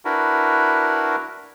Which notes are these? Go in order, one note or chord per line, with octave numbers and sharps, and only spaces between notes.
D4 E4 F#4 A#4 B4